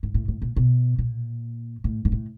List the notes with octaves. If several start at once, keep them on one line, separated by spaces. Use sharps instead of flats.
G#2
A2
A2
A#2
B2
A#2
A2
G#2
A2